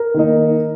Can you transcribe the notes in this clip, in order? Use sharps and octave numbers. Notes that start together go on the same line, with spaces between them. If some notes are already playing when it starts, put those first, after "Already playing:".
Already playing: A#4
D#3 A#3 D#4